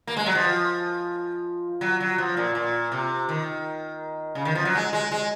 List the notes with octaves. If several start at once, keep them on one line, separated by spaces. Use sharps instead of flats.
A#3
G#3
F#3
F3
F#3
F#3
F3
A#2
A#2
C3
D#3
C#3
D#3
F3
F#3
G#3
G#3
G#3